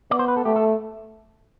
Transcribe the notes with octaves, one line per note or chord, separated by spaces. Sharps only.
B3 D5
C5
B4
A4
A3 G4
A4